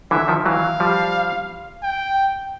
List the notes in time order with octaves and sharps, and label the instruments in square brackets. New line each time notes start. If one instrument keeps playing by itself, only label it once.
[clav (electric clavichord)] D3 E3 [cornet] E5
[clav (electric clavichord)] D#3 F3
[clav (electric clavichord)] E3 F#3 [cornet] F5
[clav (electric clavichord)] F3 G3
[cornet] G5